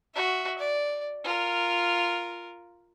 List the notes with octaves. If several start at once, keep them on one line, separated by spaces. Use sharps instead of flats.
F#4 E5
D5
F4 A#4